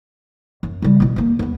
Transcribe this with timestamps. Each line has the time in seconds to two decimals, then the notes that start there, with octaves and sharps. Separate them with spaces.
0.63 F#2
0.82 C#3 G3
1.00 B2 E4
1.16 D2 A#3
1.39 D#2 B3